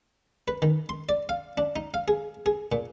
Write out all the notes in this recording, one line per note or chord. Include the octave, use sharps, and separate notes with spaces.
B4
D#3
C6
D5
F5
D4
D#4
F5
G#4
G#4
A#2